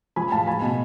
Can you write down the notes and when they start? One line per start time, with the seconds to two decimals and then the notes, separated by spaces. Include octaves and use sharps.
0.16 F3 G#5 B5
0.32 A2 F5 A5
0.47 G#3 G#5 B5
0.62 B2